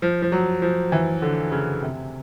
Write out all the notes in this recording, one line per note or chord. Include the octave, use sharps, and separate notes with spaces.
F3
F3
F#3
F3
E3
D3
C#3
C3